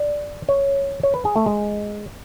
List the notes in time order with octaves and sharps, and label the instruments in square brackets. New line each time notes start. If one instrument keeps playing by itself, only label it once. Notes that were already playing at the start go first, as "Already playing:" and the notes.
Already playing: [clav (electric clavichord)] D5
C#5
C#5
B4
G#4
A3
G#3